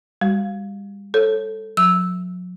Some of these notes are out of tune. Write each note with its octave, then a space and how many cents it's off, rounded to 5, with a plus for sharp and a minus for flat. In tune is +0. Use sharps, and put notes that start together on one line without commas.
G3 +35 F#4 +25
A4 +0 C#5 -25
F#3 -40 E6 -10